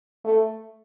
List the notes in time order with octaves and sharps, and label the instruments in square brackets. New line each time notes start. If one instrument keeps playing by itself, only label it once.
[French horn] A3